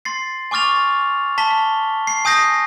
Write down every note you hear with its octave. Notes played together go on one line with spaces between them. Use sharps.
C6 A6 C7
G#5 C#6 D6 F6 A6 F7
A5 B6 G7
C7
G#5 D#6 G6 A#6 C7